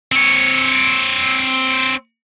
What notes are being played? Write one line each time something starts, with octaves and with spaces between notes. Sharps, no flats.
C4 C#5